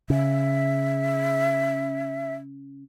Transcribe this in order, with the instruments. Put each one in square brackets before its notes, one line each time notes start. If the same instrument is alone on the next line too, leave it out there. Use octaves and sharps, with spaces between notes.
[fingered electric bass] C#3 [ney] E5